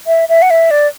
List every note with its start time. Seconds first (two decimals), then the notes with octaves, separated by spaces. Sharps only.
0.07 E5
0.29 E5
0.42 F#5
0.50 E5
0.71 D5